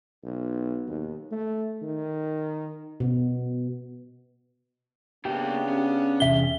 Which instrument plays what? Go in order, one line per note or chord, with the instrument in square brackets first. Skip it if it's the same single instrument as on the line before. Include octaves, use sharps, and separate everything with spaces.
[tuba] B1
D#2
A3
D#3
[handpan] B2
[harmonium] C#3 B3 D4 [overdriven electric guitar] A#3 E5 [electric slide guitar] G4
[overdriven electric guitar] C#4
[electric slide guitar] E2 C3 G#4 [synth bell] E5 G7